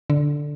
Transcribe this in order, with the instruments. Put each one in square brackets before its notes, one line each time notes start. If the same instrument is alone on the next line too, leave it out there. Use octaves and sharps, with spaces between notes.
[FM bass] D3